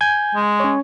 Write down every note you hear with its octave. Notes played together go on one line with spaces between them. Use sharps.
G#5 G6 G#6
G#3
C#4 C#5